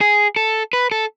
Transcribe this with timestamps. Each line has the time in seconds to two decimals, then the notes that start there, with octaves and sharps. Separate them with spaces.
0.01 G#4
0.36 A4
0.73 B4
0.91 A4